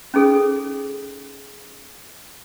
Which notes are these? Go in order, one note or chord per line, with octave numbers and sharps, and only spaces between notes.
C#4 D#4 G#4 A4